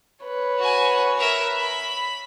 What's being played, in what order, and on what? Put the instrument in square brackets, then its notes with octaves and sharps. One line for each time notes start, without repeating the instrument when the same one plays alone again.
[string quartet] B4 C#5
[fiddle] F#4 G#5
A#4 E5
B5